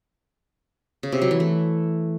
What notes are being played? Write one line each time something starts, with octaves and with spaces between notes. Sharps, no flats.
C#3
C3
F#3
E3
A3